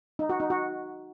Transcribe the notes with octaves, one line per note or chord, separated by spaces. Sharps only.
D#4
F#4
D#4
F#4